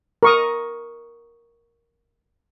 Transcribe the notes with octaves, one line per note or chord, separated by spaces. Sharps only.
A#4 C#6 D#6